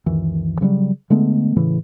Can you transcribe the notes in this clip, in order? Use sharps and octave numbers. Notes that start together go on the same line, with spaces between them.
C#2 F#2 D#3 E3
C#3 E3 F#3 G3
D3 G#3 A3 B3
A2 C#3 E3